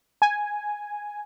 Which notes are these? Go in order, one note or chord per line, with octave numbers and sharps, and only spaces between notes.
G#5